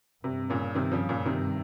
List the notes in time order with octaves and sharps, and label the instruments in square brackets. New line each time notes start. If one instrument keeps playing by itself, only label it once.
[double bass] G2 [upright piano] C3
[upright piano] A#2 C#3
C3 D#3
C#3 F3
A#2 C#3
[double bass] G2 [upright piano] C3 D#3